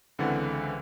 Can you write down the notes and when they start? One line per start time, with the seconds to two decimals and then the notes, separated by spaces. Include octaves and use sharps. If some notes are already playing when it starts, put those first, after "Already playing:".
0.19 C#2 D3 E3 C4 F#5 A6